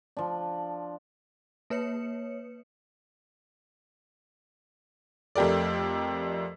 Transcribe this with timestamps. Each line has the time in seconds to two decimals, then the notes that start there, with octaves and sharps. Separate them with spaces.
0.17 F3 D4
1.70 A#3 B4 C#5 C#7
5.36 F2 A3 G4 A#4 D5